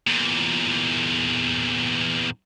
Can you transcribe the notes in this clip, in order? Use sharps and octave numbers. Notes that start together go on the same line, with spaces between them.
E2 A#2